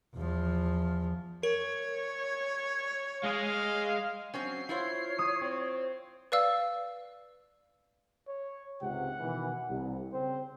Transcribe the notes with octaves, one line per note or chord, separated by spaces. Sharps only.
E2 F3
A#4 C#5
G#3 G#4 F5
F#3 C4 C#4 C7
E4 F4 C5 C#5
D#6
C4
B4 D5 F5 E6
C#5
C#2 G#2 C3 F#5
B2 D#3 E3
C2
C#3 C4 C5